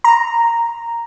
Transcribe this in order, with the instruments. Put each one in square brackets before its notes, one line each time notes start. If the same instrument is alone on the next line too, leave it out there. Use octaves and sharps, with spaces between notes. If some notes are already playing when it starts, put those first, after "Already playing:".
[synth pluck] A#5